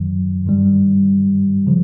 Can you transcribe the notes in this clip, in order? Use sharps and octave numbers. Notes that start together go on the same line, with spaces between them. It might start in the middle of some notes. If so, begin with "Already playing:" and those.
Already playing: F#2 D#3 F#3
G2 D#3 G3
C#3 F3